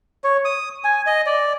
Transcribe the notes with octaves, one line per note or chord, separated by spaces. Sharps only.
C#5
D#6
G#5
D#5
D5